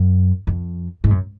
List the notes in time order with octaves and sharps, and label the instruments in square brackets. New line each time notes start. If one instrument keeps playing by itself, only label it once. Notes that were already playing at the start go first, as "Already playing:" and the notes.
Already playing: [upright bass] F#2
F2
G#2
F#2